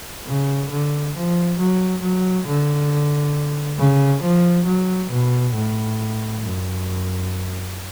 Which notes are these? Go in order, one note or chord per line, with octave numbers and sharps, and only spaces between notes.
C#3
D3
F3
F#3
F#3
D3
C#3
F3
F#3
B2
A2
F#2